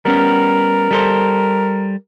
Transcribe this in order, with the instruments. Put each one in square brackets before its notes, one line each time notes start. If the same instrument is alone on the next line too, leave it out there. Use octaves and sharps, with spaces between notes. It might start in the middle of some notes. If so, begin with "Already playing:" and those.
[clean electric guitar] G3 B3 C#4 [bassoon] A#4
[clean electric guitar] G3 A4 C5